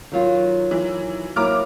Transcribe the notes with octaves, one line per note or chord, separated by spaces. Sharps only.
D#3 F#3 F4
E3
F#3 A#3 E4 A#5 D6 F6